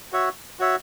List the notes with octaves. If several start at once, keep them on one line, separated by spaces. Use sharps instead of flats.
F#4 C#5 E5
F#4 C#5 E5